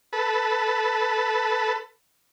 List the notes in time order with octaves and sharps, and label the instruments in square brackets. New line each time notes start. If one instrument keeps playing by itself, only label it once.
[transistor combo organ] A4 B4